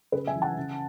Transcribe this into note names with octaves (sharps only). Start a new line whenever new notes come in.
C#3 G#4 B4
E5 G#5
E3
F#5 A5
C#3